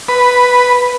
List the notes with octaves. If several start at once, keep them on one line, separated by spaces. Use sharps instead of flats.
B4